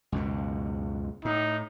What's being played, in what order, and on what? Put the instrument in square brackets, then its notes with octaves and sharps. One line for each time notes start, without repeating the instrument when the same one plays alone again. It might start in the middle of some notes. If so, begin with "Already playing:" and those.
[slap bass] C#2 F#2 B2
[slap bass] A2 [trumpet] D#4